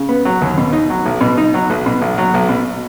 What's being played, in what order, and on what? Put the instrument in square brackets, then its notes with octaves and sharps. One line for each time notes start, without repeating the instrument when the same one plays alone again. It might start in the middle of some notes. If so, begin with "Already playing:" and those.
Already playing: [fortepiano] C#3
B3
F#3
D#2
B2
D#4
F#3
B1
B2
D#4
F#3
B1
B2
B1
F#3
B1
B2